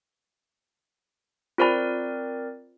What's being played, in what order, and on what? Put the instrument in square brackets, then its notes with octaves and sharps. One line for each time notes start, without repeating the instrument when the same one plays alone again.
[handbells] C4 A#4 D5 [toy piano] F4 C5 B5